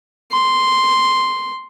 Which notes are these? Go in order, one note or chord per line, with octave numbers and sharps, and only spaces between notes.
C6